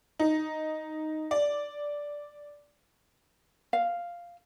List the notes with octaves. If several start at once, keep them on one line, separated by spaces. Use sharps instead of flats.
D#4
D5
F5